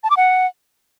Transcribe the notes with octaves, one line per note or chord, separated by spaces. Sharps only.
A5
D6
F#5